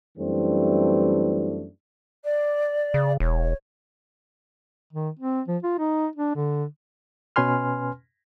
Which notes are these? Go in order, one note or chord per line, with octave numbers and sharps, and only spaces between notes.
F#2 E3 G3 A3 C4 D4
D5
C#3
E1 C#5
D#3
C4
F3
F4
D#4
D4
D3
B2 C#4 B4 G#5 C6 F6